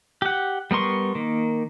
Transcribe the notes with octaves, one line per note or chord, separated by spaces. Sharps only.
G4 F#5
G3 B3 A#4 C6 C#6
D#3 A#3